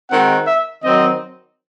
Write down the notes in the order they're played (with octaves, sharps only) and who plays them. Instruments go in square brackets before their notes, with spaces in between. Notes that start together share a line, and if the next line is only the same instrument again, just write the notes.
[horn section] D#3 G#3 C4 F#4 [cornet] F#5
[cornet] E5
[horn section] D#3 F#3 C4 [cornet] D#5